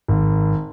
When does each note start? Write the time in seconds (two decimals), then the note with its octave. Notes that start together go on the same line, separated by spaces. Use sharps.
0.08 G#1